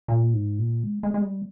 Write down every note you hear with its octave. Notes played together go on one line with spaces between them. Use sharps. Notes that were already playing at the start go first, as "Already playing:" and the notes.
A#2
G#2
A#2
G#3
G#3
G#3
G3